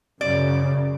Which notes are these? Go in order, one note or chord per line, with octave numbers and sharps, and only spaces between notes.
F#2 C#3 D5